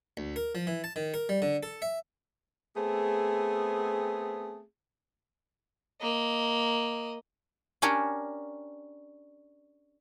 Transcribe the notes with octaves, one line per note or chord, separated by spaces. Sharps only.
D2
A#4
F3
E3
A5
D#3
A#4
G3
D3
A4
E5
A3 B3 C4 G#4
A#3 D#5
C#4 D4 G4 A#4 C#5